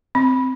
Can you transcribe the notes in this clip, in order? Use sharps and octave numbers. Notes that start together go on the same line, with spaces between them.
C4